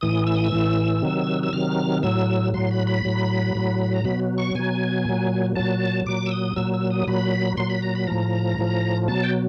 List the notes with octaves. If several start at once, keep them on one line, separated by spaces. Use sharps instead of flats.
A2 E3 D#6
E6
D#6
E6
A2 E3
C3 D#3 F#3
E6
C3 D#3 F#3 F6
A2 F#3 E6
A2 F#3 C6
B5
B5
A2 F#3
A2 F#3
A#5
B2 F#3 B5
C#6
B2 F#3 G#5
A#2 F#3
A#2 F#3 A5
A#2 F#3 D6
E6
D#6
A#2 F#3 E6
E6
D#6
A#2 F#3 B5
A#2 F#3 C6
B5
A#5
B5
A2 F3 A#5
A2 F3
B2 F#3 A5
G5